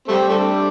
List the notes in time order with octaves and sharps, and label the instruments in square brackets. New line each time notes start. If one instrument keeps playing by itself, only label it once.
[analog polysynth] G3 [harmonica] A3 C4
[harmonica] A3 D4